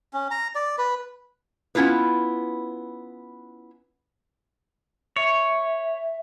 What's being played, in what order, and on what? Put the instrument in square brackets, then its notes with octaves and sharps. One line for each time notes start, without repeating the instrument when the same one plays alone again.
[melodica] C#4
A#5
D5
B4
[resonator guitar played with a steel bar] B3 C#4 E4 F4 B4
[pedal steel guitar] C#5 [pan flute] E5